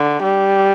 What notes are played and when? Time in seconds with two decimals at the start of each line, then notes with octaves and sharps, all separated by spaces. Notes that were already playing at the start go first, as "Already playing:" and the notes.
Already playing: D3
0.23 G3